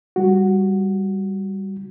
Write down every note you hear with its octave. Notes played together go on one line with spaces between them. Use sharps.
G3 F#4